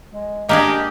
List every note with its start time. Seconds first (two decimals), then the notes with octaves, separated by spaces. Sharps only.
0.12 G#3
0.49 G#3 A#3 D4 G4 G#4 D#5